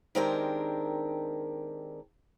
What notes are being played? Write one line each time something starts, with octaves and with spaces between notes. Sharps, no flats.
D#3 G#3 C4 D4 G4 A#4